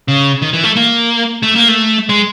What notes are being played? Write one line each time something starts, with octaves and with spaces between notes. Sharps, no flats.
C#3
D#3
E3
A3
A#3
A3
A#3
A3
G#3